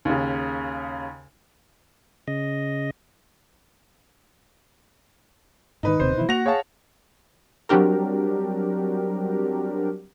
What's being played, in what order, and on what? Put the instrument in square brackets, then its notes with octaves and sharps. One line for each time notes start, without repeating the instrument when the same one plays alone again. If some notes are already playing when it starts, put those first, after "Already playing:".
[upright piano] D#2 C#3
[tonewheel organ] C#3 D#5
[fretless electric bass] G#2 D#3 [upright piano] D#4 B4
[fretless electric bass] D#1 D#2 C3 [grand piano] C5
[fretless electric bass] B2 E3 [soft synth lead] E4
[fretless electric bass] A#3 [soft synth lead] F#4 [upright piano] F#5 F7 [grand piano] A#6
[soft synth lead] G#4 [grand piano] C#5 F5 A5
[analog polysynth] F#3 G3 C4 D4 G4 A#4